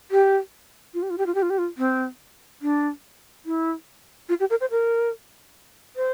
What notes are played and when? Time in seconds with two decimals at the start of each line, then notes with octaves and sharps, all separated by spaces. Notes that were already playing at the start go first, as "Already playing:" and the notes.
0.11 G4
0.94 F4
1.02 G4
1.10 F4
1.18 G4
1.26 F4
1.34 G4
1.42 F4
1.50 G4
1.58 F4
1.78 C4
2.62 D4
3.46 E4
4.29 F4
4.40 G4
4.50 A#4
4.61 C5
4.71 A#4
5.96 C5